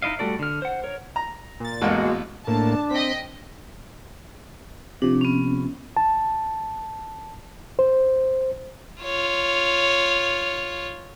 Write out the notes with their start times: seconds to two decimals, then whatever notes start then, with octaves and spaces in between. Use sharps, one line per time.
0.02 D#4 E4 D#5 F5
0.19 G3 A3 F#4 A4 D5
0.39 D3 F6
0.62 C5 F#5
0.84 A#4 C#5
1.16 A#5
1.60 A#2 A6
1.81 A1 E2 G#3 A#3 F#4
2.47 A2 A#3 D4 A5
2.91 C4 D#5 G5 B6
5.02 C3 F3 D4
5.21 B3 C#4
5.97 A5
7.79 C5
9.03 F4 C#5